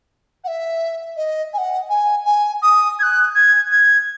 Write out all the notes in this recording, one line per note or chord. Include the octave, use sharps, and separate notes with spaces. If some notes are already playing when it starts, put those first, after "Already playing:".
F#5
E5
D#5
G#5
F#5
G#5
G#5
D#6
G#6
F#6
G#6
G#6